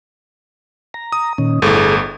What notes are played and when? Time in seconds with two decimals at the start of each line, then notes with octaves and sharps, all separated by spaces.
0.94 A#5
1.12 D#6
1.38 A#2 D#3 C#4
1.62 G1 A2 G#4 A4